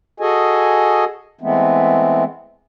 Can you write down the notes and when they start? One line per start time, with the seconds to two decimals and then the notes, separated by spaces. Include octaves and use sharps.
0.20 F#4 G#4 A4 D#5 G#5
1.41 E3 G#3 A3 B3 C4